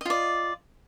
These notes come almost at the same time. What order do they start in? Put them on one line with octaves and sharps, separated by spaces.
D#5 F4 D5